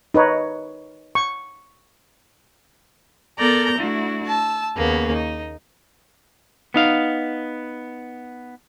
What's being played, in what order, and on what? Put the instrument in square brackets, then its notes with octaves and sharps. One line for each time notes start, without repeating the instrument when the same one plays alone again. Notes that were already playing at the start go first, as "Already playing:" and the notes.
[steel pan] D#4 B4 C#5
C#6
[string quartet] B3 A4 A#4 D5 A#5 G6
A3 D4 E4 F#4
A5 E6
D#2 C#3 A#3 B3
D#4
[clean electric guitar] B3 D#4 F5